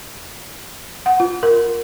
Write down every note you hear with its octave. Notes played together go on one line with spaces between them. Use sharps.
F#5
F4
A#4